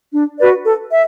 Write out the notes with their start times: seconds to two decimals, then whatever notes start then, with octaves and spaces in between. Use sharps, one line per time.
0.13 D4
0.39 F#4 B4 D5
0.64 A4
0.90 E5